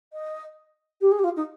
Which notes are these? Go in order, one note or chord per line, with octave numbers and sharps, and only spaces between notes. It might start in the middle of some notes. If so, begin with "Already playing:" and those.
D#5
G4
G#4
G4
F4
D#4